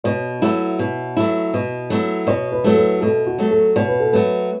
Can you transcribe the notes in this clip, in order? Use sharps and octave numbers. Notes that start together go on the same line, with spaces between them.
B2 C#5
F#3 A3 E4
B2
F#3 A3 E4
B2
F#3 A3 E4
B2 C#5
B4
F#3 A3 E4
A4
B4
B2 A4
F#4
F#3 A3
A4
B2 C#5
B4
A4
F#3 A3 B4